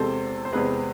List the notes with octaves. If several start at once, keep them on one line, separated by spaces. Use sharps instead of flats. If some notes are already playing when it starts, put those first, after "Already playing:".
Already playing: E2 C3 G#3 C4 A4 C5
C5
E2 C3 G#3 C4 G#4 B4